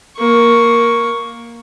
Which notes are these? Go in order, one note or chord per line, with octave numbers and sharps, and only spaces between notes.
A#3 C#6